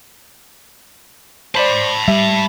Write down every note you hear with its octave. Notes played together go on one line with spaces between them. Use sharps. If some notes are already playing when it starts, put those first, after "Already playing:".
C5 D5 A5 B5
G3 E5